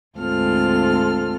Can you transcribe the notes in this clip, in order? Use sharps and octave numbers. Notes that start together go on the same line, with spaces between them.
D2 G#2 C4 F4 A4 F6